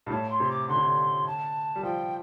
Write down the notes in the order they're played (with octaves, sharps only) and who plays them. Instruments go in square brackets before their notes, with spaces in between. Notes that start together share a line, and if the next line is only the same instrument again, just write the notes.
[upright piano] G2
[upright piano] A2 [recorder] A5
[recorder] C6
[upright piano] C3
[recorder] D6
[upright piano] D3 [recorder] C6
[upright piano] C3
D3
[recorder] A5
[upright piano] G3
[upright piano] F3 [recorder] G5